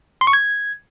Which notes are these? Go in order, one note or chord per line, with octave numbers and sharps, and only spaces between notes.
C6
C#6
G#6